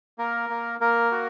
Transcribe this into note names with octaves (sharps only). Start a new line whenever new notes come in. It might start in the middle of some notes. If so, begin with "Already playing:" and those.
A#3 A#4
A#3
A#3 A#4
F#4